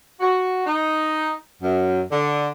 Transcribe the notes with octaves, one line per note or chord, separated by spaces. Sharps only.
F#4
D#4
F#2
D3